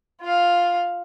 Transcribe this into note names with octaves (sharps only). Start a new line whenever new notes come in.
F4 F5